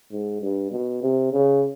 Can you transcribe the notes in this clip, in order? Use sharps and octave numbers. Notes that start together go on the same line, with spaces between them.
G#2
G2
B2
C3
C#3